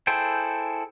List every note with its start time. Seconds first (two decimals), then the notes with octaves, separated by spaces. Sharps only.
0.07 E4 G#4 A4 C5 G5